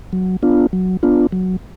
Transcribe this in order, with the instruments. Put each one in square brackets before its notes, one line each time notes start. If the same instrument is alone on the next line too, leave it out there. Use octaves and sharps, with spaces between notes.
[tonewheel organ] F#3
B3 D4 F4
F#3
B3 D4 F4
F#3